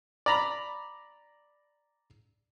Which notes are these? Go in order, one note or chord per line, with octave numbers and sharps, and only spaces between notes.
D5 A#5 B5